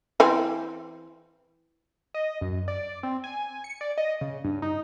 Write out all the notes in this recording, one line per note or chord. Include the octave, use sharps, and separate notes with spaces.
E3 C4
D#5
F#2
D5
C4
G#5
C#7
D5
D#5
C#3
G2
D#4